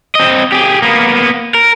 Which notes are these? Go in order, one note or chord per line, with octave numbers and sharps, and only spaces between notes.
C4 D#5
G4 G#4
A#3 B3
A#4